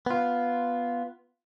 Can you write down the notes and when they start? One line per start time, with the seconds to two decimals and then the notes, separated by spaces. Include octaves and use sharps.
0.06 B3 F4